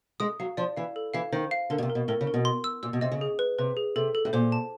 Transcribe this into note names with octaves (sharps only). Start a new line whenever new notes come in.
G#3 D#6
F#3 F5
F3 D5
E3 F5
A4
E3 F5
D#3 C5
F5
D3 A#4
B2
C3
A#4
B2
A2 A#4
C#3
A#4
B2
C6
E6
A#2 E6
B2
C3 D#5
C#3
G#4
B4
C3 B4
G#4
C3 A4
A4
A2
A#2 C5
A5